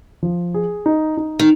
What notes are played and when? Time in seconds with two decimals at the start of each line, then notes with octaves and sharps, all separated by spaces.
0.23 F3
0.54 G#4
0.86 D#4
1.17 D#4
1.39 D#3